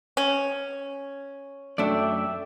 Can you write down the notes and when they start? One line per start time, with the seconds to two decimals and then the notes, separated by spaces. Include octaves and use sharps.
0.17 C#4
1.78 F#2 A3 D4 D5 E5 G5